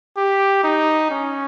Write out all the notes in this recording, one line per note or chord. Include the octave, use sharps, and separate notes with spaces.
G4
D#4
C#4